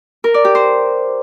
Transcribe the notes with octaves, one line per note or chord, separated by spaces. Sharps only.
A#4
D5
G4
C5